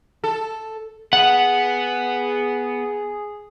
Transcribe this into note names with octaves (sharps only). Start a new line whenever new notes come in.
A4
B3 G#4 F#5